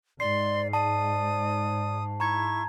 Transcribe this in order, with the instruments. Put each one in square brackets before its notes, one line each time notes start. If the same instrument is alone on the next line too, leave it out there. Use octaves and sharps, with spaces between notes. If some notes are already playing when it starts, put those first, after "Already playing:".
[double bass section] G#2 [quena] D5 [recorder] C6 [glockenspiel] C7
[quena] D5 [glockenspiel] A5 [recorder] D#6
[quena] E4 [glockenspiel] A#5 G#6 [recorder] C#6